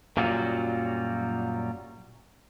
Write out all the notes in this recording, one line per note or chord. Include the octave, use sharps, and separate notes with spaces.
F#2 A#2 F#3 G3 F4 F#4